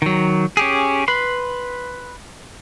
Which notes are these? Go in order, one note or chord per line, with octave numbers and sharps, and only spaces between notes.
D#3 F#3
C#4 G4 G#4
B4 B5 C6